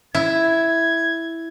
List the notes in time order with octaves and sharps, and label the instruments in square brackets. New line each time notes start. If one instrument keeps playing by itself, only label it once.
[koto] E4 [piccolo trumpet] G#6